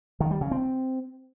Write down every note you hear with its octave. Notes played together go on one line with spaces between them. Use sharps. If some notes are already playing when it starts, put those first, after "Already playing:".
D#3
G3
C#3
C4